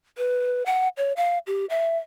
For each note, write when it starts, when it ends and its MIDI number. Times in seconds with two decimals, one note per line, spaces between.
0.18 0.63 71
0.66 0.88 78
0.97 1.13 73
1.17 1.38 77
1.47 1.66 67
1.70 1.98 76